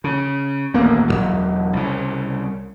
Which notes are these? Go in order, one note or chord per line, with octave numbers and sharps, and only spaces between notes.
C#3
D#1 A1 A#3 B3
E1 F#2 F#3
C2 C#3